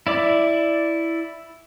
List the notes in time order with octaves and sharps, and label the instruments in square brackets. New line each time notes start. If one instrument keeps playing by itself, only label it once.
[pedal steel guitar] E4 D5 D6